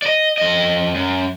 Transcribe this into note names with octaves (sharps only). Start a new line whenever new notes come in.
D5 D#5
F2 D#5
F#2